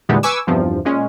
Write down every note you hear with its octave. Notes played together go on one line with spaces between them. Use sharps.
E2 A#2 D3 G3 G#3 B3
B4 G#5 C#6 D6 E6
E2 G2 C3 F3
A#2 G#3 C#4